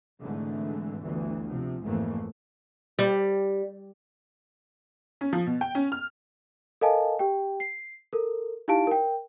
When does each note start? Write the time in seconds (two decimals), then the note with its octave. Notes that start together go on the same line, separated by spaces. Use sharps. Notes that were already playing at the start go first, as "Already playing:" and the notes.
0.21 G#1 G#2 D3 E3 A3
1.03 G1 D2 E3
1.48 C3 F3
1.83 A1 F2 G#2 E3 A3 A#3
2.99 G3
5.21 C#4
5.33 F3
5.46 B2
5.61 G5
5.75 C#4
5.92 F6
6.81 A4 A#4 D#5 F5 G#5 A5
7.19 G4 G5
7.60 C7
8.13 A4 A#4
8.68 D#4 E4 G4 F5 A5 D7
8.87 A#4 G5